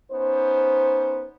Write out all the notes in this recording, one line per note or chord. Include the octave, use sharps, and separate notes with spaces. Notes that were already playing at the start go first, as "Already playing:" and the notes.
B3 C#4 D#4 C5